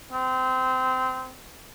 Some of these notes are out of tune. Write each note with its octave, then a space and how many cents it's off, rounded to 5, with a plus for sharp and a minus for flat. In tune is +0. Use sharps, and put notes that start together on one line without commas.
C4 -25